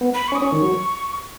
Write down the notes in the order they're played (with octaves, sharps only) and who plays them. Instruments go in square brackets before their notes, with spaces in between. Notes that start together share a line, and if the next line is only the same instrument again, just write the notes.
[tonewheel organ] B3
[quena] B5
C#6
[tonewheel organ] C#4
[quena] D#6
[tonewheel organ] C#4 [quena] C#6
[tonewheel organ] D#3
F#3